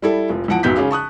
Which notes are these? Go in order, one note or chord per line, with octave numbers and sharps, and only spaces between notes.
G3 E4 A4
F1 F3
E2 F3 F#5 A5 D7
B1 F#2 B3 G6 B6
C#3 C#4 G#4 F5 D6
A5 C#6 D#6 F#6